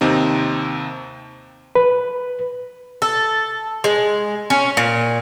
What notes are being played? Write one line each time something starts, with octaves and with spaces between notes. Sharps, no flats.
D#2 C3 C4 D#4
B4
A4
G#3
C#4
A#2